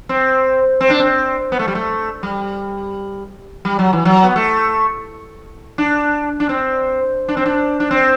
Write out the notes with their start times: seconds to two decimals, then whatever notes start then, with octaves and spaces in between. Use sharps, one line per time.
0.09 C4
0.81 C4
0.90 D4
1.00 C4
1.52 B3
1.59 A3
1.68 G3
1.75 A3
2.23 G3
3.65 G3
3.79 F#3
3.93 E3
4.05 F#3
4.24 B3
4.36 A3
5.78 D4
6.40 D4
6.49 C4
7.28 D4
7.37 C4
7.46 D4
7.80 D4
7.91 C4